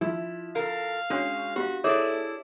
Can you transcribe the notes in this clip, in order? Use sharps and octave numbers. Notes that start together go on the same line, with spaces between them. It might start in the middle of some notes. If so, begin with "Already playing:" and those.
F3 E4
A4 A#4 F5
G#3 C#4 D4 F#4 F#5 G6
B3 F#4 G4 F5
E4 G#4 A4 C#5 D5 E5 D6